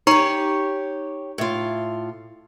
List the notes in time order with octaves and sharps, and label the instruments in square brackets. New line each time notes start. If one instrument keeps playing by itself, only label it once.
[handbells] D#4 A#5 C#6 [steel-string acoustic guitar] G4 C#5
[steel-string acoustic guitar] A2 F4